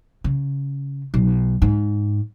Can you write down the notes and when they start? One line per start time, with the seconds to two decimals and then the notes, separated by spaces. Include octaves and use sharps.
0.24 C#3
1.14 B1
1.62 G#2